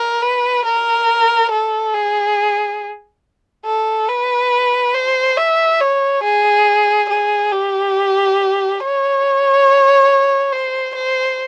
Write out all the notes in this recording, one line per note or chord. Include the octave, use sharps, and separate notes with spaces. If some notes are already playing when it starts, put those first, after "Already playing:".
Already playing: A#4
B4
A#4
A4
G#4
A4
B4
C5
E5
C#5
G#4
G#4
G4
C#5
C5
C5